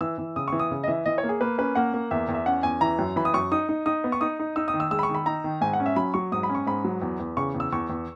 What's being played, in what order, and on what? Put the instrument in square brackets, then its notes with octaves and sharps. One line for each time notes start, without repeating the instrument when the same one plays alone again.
[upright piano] E3 E6
E3
C#3 D#6
E3 C#6
D#6
C#3
D#5
E3 E5
E3 D#5
C#5
A#3
G#4
A#3 B4
C#4 B4
A#3 F#5
A#3
E2 E5
E2
E5
C#4 F#5
E2 G#5
E3 A#5
F#2
E3 B5
D#6
F#2 C#6
D#4 D#6
D#4
D#4 D#6
B3
C#6
D#4 D#6
D#4
D#4 E6
D#6
D#3
E6
G#3 E6
B5
C#6
D#3
B5
D#4 A#5
D#3
G#2 G#5
F#5
C#4
E5
F#3 B5
F#3 C#6
G#2 D#6
B5
C#4
C#6
G#2 B5
F#3
E2
E2
C#3 C#6
E2
E6
E2 C#6
E2